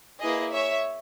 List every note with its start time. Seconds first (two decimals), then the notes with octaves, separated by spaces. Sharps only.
0.20 A#3 E4 G#4 B4 D#5
0.53 C#5 E5